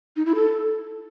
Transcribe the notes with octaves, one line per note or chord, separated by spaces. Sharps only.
D#4
E4
A4